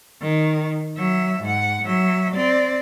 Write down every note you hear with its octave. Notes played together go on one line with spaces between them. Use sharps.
D#3
F#3 E5
G#2 F#5
F#3 E5
C4 D5